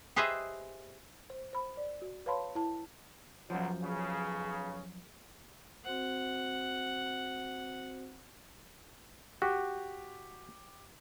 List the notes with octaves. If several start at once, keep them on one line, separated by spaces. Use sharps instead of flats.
G4 G#4 B4 C5 D#5 E5
C5
C5 B5
D5
F#4
B4 C#5 F5 A5 B5 C6
E4 A5
C#2 F#2 B2 F3 F#3
B1 C#3
C4 F#4 C5 F#5
F#4 G4